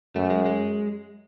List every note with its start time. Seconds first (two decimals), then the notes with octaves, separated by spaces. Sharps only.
0.15 F#2 A3
0.30 G#3
0.46 G#3